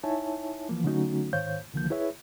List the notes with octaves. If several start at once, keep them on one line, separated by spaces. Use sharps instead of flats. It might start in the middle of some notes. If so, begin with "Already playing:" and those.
D#4 E4 C#5 E5 G#5 A5
E3 F3 A#3
D3 F#3 A3 C#4 D#4 F#4
G#2 D#3 C5 C#5 F5 G6
C2 D3 D#3 F3 A#3 G6
E4 G#4 B4 C#5 E5